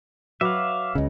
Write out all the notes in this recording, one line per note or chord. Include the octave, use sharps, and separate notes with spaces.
F#3 B4 E5 F5 D6
C#2 C#3 D#5